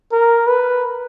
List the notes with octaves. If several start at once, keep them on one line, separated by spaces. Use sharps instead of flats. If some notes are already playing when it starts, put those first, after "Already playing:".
A#4
B4